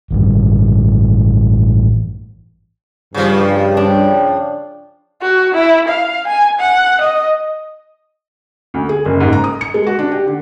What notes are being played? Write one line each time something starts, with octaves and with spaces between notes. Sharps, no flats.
A1 G2
G2 C#3 F3
D4 D5 G5
F#4
E4
F5
G#5
F#5
D#5
D2
G#4
F#1
G#2
A#5
D#6
C#7
G#3
F#4
D4
G4
D3